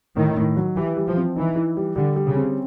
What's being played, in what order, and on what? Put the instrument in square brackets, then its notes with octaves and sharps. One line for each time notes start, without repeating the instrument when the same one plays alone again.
[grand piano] A2 [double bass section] D#3
[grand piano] A2
F#3
[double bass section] E3 [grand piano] G4
[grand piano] G3
[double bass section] F3
[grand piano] C4
[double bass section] E3 [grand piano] D#4
[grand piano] E3
G3
[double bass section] D3 [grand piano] G3
[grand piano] G3
[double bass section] C#3
[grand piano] C4